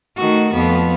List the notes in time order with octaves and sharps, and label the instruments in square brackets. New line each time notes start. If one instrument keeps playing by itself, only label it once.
[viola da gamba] D#3 A3 F#4
F2 F3 B3